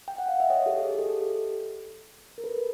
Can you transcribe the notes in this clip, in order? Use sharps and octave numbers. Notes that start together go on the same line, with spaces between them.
G5
F#5
F5
E5
C#5 D#5
G4 A4
G#4
G4 A4
A#4
A4 B4